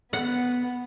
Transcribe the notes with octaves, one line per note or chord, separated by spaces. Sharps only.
B3 F#5